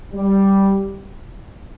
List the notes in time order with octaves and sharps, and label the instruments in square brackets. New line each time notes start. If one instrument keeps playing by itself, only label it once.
[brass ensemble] G3